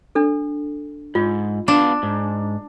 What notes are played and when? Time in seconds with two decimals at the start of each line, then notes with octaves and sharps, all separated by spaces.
0.15 D4 A4
1.15 G#2 F4
1.68 B3 D4 F5 A5
2.03 G#2